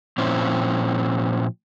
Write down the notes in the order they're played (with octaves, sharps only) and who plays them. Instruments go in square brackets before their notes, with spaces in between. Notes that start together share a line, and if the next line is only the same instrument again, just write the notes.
[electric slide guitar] A#2 F3 C4 C#4 E4